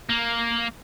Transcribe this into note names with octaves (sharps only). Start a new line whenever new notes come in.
A#3